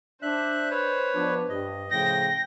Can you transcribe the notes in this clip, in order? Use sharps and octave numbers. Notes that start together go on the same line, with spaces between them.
D4 C5 E5 F#6
B4 C#5
F3 B3 D4
G2 D#5
A2 C#3 F3 G5 A#6